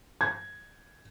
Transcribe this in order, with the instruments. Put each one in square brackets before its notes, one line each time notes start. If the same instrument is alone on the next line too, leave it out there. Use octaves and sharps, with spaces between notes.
[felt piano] G#6